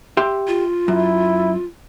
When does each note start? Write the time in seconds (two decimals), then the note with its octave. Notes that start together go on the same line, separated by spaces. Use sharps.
0.17 G4 E5 C6
0.47 F4
0.88 F#2 E4